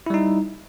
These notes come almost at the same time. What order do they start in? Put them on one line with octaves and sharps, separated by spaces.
E4 G3 D#4